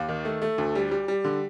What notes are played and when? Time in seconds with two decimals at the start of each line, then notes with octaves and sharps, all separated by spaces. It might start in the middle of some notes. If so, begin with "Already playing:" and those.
Already playing: D#2
0.08 D#3
0.25 A3
0.42 A3
0.58 D2
0.75 G3
0.91 G3
1.08 G3
1.25 D3